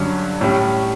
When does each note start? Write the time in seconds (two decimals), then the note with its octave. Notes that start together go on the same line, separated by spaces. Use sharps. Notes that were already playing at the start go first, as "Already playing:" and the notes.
Already playing: G2 D3 F#3 C#4
0.41 A2 G3 C#4